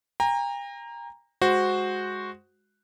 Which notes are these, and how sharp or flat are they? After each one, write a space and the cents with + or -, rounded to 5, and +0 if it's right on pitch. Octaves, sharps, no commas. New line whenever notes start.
G5 +45 A#5 +0
G#3 +0 F#4 +0 C5 +0